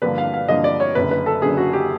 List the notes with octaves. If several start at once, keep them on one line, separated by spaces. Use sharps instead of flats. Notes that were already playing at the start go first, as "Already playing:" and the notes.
G2 D3 F3 A#3 B4
F5
F5
G2 D3 F3 A#3 D#5
D5
C#5
F#1 F#2 D3 B4
B4
A4
F#1 F#2 D3 G#4
F#4
G4